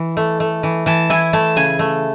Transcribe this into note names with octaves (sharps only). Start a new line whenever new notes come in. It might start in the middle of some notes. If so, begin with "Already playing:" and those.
Already playing: E3
A3
A3
E3
E3 A5
E4 G#5
A3 A5
C#3 G#5
A3